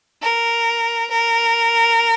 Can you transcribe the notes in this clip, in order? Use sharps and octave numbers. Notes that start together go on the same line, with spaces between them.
A#4
A#4